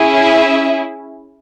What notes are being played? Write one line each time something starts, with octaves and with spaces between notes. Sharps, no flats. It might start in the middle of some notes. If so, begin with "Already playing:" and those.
Already playing: C#4 E4 G#4
E5